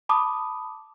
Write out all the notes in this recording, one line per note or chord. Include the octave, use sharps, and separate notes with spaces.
A5 B5 D6 D#6